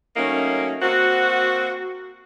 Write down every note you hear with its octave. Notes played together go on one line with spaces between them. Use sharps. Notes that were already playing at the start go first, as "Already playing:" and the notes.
F#3 A3 A#3 C#4 D#4
A#3 C4 F#4